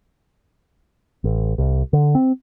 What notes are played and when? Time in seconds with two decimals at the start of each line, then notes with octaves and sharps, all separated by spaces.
1.24 A1
1.58 C2
1.93 D3
2.15 C4